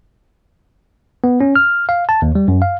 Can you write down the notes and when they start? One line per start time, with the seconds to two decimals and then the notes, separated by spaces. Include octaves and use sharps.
1.24 B3
1.41 C#4
1.56 F6
1.89 F5
2.09 A5
2.22 D#2
2.35 G3
2.48 F#2
2.62 F5